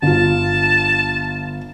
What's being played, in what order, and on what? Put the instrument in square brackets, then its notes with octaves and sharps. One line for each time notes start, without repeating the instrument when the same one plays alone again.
[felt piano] G1 F4 [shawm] A5